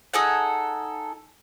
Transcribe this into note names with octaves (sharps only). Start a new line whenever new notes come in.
D#4 G#4 A4 F#5